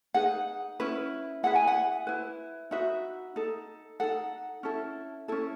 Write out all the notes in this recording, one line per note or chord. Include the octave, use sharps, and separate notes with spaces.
D#4 G#4 B4 F#5
C#4 E4 B4
E4 G#4 B4 F#5
G#5
F#5
E4 B4
D#4 F#4 B4 E5
D#4 A4
D#4 A4 F#5
C#4 E4 A4
C#4 E4 A4